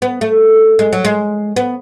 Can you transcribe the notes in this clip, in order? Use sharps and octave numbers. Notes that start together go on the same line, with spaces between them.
B3
A3
G#3
F#3
G#3
B3